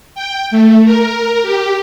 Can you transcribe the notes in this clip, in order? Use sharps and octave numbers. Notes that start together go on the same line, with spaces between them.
G5
A3
A#4
G4